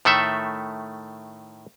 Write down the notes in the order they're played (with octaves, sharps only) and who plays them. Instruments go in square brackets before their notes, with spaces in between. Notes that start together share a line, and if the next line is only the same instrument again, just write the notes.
[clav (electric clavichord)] A2 D#3 A3 A4 E5